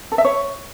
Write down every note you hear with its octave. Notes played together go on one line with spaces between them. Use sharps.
A4
E5
C#5